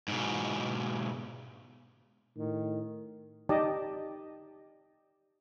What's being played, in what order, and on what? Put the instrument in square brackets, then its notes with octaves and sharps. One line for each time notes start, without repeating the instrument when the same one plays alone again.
[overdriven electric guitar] G#2 B2
[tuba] A2 [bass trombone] D#3
[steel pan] D#4 G4 D5 D#5 A5